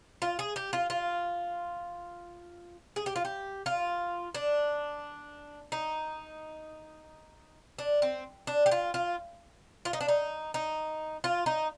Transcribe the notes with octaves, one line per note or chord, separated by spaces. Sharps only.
F4
G#4
G4
F4
F4
G#4
G4
F4
G4
F4
D4
D#4
D4
C4
D4
G4
F4
F4
F4
D#4
D4
D#4
D#4
F4
D#4